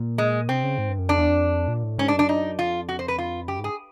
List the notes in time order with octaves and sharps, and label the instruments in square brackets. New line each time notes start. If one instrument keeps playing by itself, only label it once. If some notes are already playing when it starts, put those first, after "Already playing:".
Already playing: [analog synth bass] A#2
[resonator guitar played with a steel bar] G#3
[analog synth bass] C3 [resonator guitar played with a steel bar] C4
[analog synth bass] C#3
G#2
G2
F#2
[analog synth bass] F2 [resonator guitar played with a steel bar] D4
[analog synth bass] E2
F2
A#2
A2
[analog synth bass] G#2 [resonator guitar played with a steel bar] C#4
[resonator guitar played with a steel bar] D4
[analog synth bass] F#2
[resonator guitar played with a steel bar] D4
D#4
[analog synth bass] F2 [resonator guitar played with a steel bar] F4
[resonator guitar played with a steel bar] F#4
C5
B4
F4
[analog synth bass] F#2 [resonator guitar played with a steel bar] G4
[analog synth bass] G#2
[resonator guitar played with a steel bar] G#4